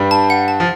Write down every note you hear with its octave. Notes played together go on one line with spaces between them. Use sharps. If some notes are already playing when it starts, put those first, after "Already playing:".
Already playing: G2 G3
A5
F#5
A5
F3